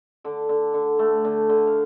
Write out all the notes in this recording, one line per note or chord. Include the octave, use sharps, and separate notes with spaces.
D3 D5
D3
D3
A3
D3
D3
F5